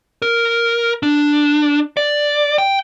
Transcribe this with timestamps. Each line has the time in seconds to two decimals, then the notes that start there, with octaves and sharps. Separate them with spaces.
0.22 A#4
1.03 D4
1.97 D5
2.58 G5